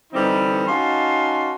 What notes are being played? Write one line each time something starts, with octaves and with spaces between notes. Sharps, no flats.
D3 E3 G3 C4 D#4
C#4 D#4 F#4 F5 A5 C6